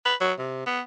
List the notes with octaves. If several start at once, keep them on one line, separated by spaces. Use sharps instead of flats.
B4
F#3
C3
B3